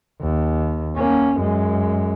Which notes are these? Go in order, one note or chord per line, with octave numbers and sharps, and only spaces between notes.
D#2
A#3 C#4
F#2 G#3